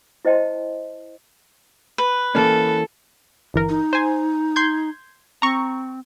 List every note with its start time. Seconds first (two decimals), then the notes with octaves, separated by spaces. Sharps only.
0.25 E4 C5 D#5 G5 A5 C6
1.98 B4
2.35 E3 A#3 C#4 A4
3.54 G1 E3 A#4
3.69 D#4
3.93 C5 G#5
4.56 C6 G6 G#6
5.42 C4 A#5 C#6